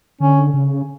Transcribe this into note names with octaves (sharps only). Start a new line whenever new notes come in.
D3 C#4
C#3